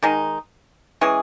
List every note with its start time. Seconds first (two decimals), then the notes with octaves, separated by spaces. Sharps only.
0.03 D#3 G#3 D#4
1.01 E3 G#3 C#4 G#4